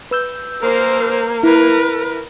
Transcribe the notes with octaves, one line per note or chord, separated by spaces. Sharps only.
B4 E6 G6
A#3 A#4 C5
E4 A#4 B4